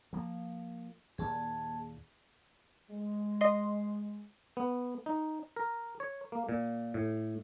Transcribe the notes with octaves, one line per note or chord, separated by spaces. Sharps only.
F3 A#3
D#2 A#2 G#4 A5
G#3
D#5 C6
B3
D#4
A#4
C#5
A#3
A#2
A2